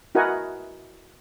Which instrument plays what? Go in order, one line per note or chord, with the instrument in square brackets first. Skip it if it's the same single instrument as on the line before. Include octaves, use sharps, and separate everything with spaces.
[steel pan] E4 F#4 A#4 D#5 F#5 G#5